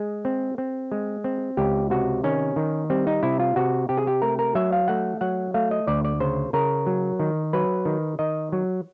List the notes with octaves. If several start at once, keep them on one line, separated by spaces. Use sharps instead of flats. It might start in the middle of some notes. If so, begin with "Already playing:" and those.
Already playing: G#3 G#4
C4
C4
G#3
C4
C#2 G4
C3 F#4
D#3 C#4
D#3
G3 C4
D#4
C3 E4
F4
C3 F#4
C3 G4
G#4
G4
A3 A#4
A#4
F#3 E5
F5
A3 F#5
F#3 F#5
A3 F5
D#5
D2 D5
D5
C#3 C5
C#3 A#4
F#3
D#3
F#3 B4
D#3
D#3 D#5
F#3